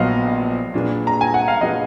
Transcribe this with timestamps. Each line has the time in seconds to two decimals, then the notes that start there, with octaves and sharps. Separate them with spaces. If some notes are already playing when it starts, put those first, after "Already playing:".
Already playing: A#1 A#2 F#3 B3 D#5 F5
0.74 A#2 F#3 D4 G#4 B4
1.07 A#5
1.21 G#5
1.34 F#5
1.48 F5
1.61 A#2 F#3 D4 G#4 B4 D#5